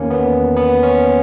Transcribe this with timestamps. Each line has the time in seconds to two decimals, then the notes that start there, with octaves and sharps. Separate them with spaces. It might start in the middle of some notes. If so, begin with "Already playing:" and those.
Already playing: E2 D#3 A#3 C#4
0.10 B3
0.57 B3
0.83 C#4